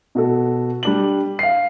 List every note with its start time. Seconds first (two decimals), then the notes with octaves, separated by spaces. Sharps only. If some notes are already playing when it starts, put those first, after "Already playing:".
0.15 B2 F#4 A4
0.83 G3 D4 F#7
1.39 F5 C7